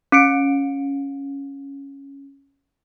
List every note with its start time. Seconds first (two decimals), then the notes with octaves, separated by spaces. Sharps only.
0.12 C#4 C#7 D7